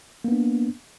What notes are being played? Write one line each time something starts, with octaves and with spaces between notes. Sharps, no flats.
A#3 B3 D4